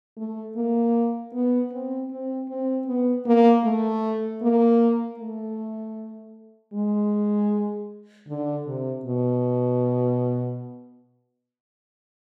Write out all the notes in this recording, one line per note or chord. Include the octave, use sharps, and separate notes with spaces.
A3
A#3
B3
C4
C4
C4
B3
A#3
A3
A#3
A3
G#3
D3
C3
B2